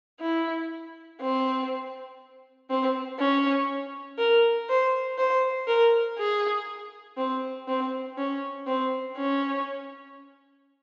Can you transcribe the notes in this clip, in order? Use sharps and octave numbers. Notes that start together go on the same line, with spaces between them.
E4
C4
C4
C#4
A#4
C5
C5
A#4
G#4
C4
C4
C#4
C4
C#4